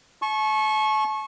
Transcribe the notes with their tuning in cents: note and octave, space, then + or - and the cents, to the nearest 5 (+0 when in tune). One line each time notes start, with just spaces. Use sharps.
A5 -40 C#6 -20